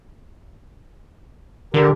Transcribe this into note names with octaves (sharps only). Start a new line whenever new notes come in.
D3 G4 A#4